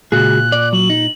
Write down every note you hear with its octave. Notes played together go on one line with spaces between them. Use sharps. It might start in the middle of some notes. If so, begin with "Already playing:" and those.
C#2 A#2 F#4 G#4 F#6
D5
F#3 F#7
D#4